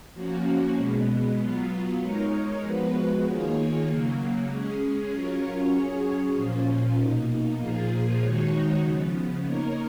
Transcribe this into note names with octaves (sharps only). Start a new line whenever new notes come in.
F3 A#3 C#4 F#4
B2 G#3 B3
F#3 B3 F4
G#3 D#4 A#4 C#5
F3 G#3 B3 F#4 B4
D#3 A#3 F4 G#4 C#5
C#3 F#3 A#3
G#3 C#4 G#4
F#3 C#4 F4 A#4 C#5
F#3 C#4 G#4 C#5
A#2 F3 A#3 C#4 F4
B2 A#3 D#4
A#2 F3 A#3 F4 G#4
D#3 G#3 D#4 F#4 C#5
C#3 F3 B3
A#3 D#4 A#4 C#5